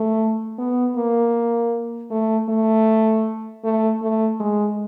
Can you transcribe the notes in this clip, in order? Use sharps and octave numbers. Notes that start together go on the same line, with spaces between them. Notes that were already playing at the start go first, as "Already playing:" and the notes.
Already playing: A3
B3
A#3
A3
A3
A3
A3
G#3